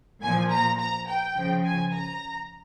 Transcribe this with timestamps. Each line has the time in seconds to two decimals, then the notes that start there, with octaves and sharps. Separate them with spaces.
0.22 A#2 F3 G#5
0.50 A#5
0.79 A#5
1.07 G5
1.35 C#3 F3
1.64 G#5
1.92 A#5